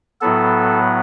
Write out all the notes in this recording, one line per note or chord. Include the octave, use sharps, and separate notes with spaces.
A2 F#3 B3 A4